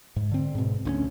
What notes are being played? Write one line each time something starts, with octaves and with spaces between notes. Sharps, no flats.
G#2
D3 C4
G#2 B2
D2 C4 C#4